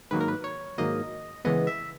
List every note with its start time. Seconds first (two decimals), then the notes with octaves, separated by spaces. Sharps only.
0.11 G#2 D#3 F#3 A#3 B4
0.20 A#4
0.28 B4
0.44 C#5
0.78 G#2 D#3 F#3 A#3 D#5
1.45 C#3 E3 G#3 B3 D#5
1.67 E5